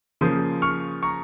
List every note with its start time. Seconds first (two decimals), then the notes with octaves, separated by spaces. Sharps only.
0.21 C#3 F3 A#3 C6 D#6
0.62 C#6 F6
1.03 A#5 C#6